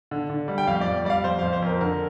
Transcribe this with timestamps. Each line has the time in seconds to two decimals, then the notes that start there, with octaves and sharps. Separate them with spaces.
0.11 D3
0.30 D3
0.48 G3
0.58 G5
0.67 F2 F5
0.81 D5
0.87 F2
1.05 G3 D5
1.10 F5
1.24 F2 C5
1.39 F2 F5
1.53 C5
1.62 F2 A#4
1.81 D3 A#4